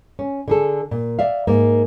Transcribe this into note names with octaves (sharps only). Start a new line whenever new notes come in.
C#4
D3 G#4 A4
A#2
D5 E5 F5
G#2 A#3